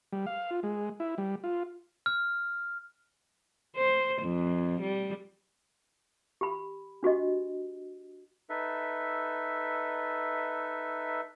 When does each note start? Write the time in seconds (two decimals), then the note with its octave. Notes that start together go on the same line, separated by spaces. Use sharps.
0.12 G3
0.26 F5
0.51 F4
0.63 G#3
1.00 E4
1.18 G3
1.44 F4
2.06 F6
3.76 C5
4.22 F2
4.82 G3
6.41 G4 B5
7.03 D4 F#4 G4 D#5
8.49 D#4 A4 B4 E5